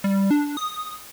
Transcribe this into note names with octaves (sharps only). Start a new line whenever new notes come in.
G3
D4
D#6